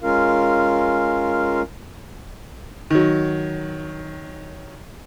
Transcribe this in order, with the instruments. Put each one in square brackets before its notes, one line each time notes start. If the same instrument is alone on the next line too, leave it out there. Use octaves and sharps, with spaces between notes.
[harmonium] G#3 C#4 F4 A#4 F5
[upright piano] D#3 F#3